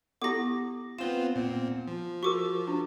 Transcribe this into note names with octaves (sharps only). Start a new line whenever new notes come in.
B3 E4 G4 A4 D6 A#6
B3 C4 F4 E7 G7
A#2 B3 C4
F3
F#4 G#4 A#4 C#6 D6
D4